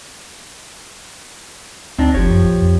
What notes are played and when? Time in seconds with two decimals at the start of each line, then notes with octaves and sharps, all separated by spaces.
1.98 D2 C4 D4 D#4
2.15 F#1 F3 G4 C#5
2.30 F#2
2.44 A#1
2.61 F2